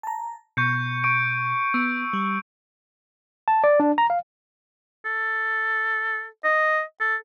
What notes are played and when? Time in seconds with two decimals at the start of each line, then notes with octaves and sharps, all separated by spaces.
0.03 A5 A#5
0.57 B2 C#6 G6 C#7
1.04 C#6 D7
1.74 B3 E6 D7
2.13 G3
3.48 A5
3.64 D5
3.80 D4
3.98 A#5
4.10 F5
5.05 A4
6.44 D#5
7.00 A4